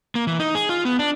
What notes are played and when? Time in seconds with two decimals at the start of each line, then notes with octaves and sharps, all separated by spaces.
0.15 A#3
0.27 E3
0.39 D#4
0.55 G#4
0.69 F4
0.85 B3
0.99 D4